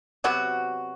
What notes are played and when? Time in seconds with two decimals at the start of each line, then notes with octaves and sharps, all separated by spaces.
0.24 C3 F#3 B3 F#4